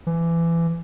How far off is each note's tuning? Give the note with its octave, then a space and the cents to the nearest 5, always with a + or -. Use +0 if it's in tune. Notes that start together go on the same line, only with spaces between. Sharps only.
E3 +25